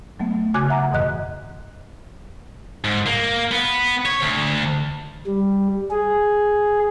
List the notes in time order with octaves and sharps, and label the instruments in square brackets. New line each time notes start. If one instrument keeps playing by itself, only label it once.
[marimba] F#3 A3 B3
C#3 F#4 G#5 D6 F#6 G#6
E5 F#5 A#5
F2 G#2 B2 E3 D#5 F#6
[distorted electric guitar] G#2
A#3
B3
C#5
D2
[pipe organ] G3
G#4